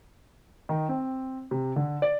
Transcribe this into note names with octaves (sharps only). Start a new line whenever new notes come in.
D#3
C4
C3
D3
D5